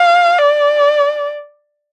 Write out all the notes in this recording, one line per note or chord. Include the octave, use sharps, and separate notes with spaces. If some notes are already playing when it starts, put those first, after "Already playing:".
Already playing: F5
D5